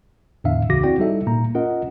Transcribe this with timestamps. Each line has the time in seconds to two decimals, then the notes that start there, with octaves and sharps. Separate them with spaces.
0.44 E2 A2 D3 D4 E5 F5
0.69 C#2 C#3 E3 F#4 D6 A#6
0.83 C4 E4 F#4 D5 G5
0.99 G3 D#4 E4 A4 E5
1.26 A#2 A#3 A#5
1.55 C#4 F4 A#4 D#5 F#5